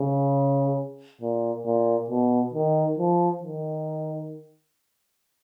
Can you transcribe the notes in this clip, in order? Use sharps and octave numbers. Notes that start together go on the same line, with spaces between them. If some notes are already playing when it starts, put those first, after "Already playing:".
Already playing: C#3
A#2
A#2
B2
D#3
F3
D#3